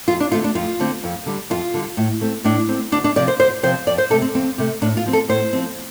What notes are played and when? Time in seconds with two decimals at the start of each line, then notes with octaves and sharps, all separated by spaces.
0.08 F2 F4
0.20 D4
0.31 D3 A3 C4 F4
0.44 D4
0.55 F2 F4
0.79 D3 A3 C4
1.04 F2
1.26 D3 G3
1.50 F2 F4
1.74 D3 G3
1.97 A2
2.21 A3 C4
2.44 A2 D4
2.68 A3 C4
2.92 D2 D4
3.04 D4
3.16 C3 F3 C4 D5
3.28 C5
3.40 D2 C5
3.63 C3 F3 C4 C5
3.87 F2 D5
3.98 C5
4.10 C3 A3 A4
4.22 C4
4.34 F2 C4
4.58 C3 A3
4.82 A2 D4
4.97 F4
5.06 F3 C4
5.13 A4
5.29 A2 C5
5.53 F3 C4